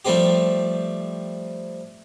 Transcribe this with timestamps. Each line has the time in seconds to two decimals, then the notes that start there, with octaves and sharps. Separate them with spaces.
0.05 F3 G3 A3 C4 G4